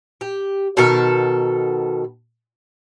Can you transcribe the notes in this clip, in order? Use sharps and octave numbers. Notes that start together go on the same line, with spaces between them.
G4
B2 D#3 A4 A#4